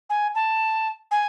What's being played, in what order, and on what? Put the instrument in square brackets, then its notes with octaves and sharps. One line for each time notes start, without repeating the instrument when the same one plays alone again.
[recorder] G#5
A5
G#5